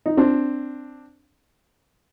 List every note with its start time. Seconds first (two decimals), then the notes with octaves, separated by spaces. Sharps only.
0.06 D#4
0.17 C4 D4